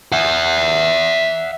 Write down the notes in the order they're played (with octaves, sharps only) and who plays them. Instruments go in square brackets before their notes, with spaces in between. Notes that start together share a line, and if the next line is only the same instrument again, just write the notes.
[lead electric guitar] E5 F#5